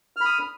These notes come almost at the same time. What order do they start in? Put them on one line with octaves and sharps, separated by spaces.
F6 B5 D#6